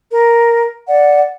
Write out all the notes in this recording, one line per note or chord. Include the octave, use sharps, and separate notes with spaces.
A#4
D5 F#5